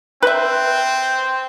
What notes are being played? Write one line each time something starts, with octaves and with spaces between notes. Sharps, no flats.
C4 B4 E5